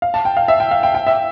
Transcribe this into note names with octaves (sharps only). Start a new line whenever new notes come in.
F5
A5
G5
F5
E5
G5
F5
G5
G5
E5